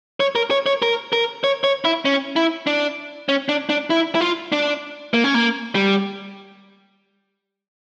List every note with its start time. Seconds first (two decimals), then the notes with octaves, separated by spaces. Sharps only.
0.20 C#5
0.35 A#4
0.51 C#5
0.66 C#5
0.82 A#4
1.13 A#4
1.44 C#5
1.64 C#5
1.85 E4
2.05 C#4
2.36 E4
2.67 D4
3.29 C#4
3.49 D4
3.69 D4
3.90 E4
4.15 E4
4.20 F4
4.52 D4
5.14 A#3
5.24 C#4
5.34 A#3
5.75 G3